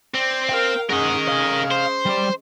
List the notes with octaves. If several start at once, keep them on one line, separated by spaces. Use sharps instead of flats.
C4 D5 G5
A#4 F5 G5
G#3 C#4 G#4 A#4 D#5 F#5
F5 G#5
C5
G3 D5